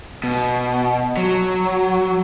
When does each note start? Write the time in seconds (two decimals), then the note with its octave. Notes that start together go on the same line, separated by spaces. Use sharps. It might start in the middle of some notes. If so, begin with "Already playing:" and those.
0.24 B2
1.17 F#3